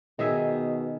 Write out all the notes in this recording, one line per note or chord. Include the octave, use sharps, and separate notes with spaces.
B2 D#3 G#4 D#5 E5